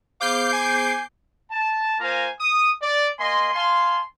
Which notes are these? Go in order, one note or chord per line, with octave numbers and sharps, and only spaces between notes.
B3 G#4 C5 F5 D6 G6 C7
G#5
A5
A#3 F4 C5 F5 G#5 A#5
D#6
D5
A#3 D#5 G#5 C6
F5 G#5 A5 C6